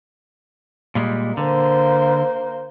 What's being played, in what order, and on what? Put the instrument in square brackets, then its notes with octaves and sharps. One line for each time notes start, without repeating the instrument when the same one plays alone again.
[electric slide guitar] A#2 G3 G#3
[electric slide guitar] D3 [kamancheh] A#3 C5